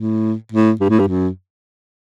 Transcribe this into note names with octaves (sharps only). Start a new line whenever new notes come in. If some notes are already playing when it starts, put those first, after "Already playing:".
Already playing: A2
A2
G2
A2
G2
F#2